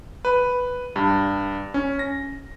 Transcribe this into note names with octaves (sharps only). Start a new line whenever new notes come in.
B4
G2
C#4
A#6